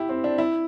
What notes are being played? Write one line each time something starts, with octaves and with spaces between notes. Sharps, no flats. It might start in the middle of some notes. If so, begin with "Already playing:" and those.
Already playing: E4 G4
C4
D4
E4